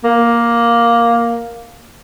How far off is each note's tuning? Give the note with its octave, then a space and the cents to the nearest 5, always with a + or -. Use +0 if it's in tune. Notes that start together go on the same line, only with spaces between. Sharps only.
A#3 +5